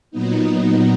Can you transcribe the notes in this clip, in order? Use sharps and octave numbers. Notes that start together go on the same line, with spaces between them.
A#2 F#3 B3 D#4